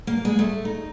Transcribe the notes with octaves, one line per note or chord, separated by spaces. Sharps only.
A#3
G#3
A3
D#4